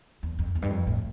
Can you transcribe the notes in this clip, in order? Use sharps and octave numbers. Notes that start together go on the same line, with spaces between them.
E2
F2
E2
G2
F2
A2